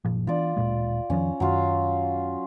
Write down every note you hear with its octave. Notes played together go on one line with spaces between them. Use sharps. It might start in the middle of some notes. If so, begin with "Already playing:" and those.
F#1 A#2 F3
E3 B3 D4 F4 D5
D1 A#2 G#3
F2 D#3 F3 C#4
F#2 D#3 F#3 F4